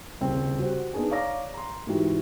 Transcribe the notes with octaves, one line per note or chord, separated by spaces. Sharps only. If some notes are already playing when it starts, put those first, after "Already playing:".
D#1 C2 C#3 C4 C#4
F#4 G4 C5 F#5
B3 D4 D#4 G#4 G#5
C#5 D5 F5 A#5 D6 A#6
A#5 C6
G#2 E3 D#4 F#4 G4